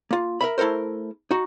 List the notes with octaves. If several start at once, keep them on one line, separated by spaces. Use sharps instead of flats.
A#3 F4
A#4 E5 B5
A3 E4 A4 A#4 C5
D#4 F#4